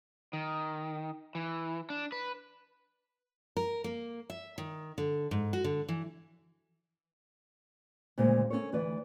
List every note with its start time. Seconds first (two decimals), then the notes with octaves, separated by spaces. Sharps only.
0.33 D#3
1.35 E3
1.90 D4
2.12 B4
3.57 A#4
3.84 A#3
4.30 E5
4.58 D#3
4.98 D3
5.31 G#2
5.53 F#4
5.64 D3
5.89 E3
8.18 D2 A#2 C#3 G#3 C5
8.50 C#4 E4 A4 A#4 C#5
8.72 D2 E3 B4 D5